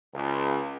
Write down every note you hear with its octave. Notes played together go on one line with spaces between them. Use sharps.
C#2